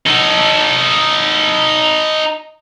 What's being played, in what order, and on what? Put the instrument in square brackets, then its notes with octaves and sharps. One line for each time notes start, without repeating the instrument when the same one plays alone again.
[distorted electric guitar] D#4 A4